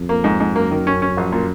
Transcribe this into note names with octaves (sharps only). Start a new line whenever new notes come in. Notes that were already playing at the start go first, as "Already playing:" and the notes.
Already playing: F2
A#3
G#2
G#2
F#2 A#3
D#3
C#4
C#4
A#1
A#2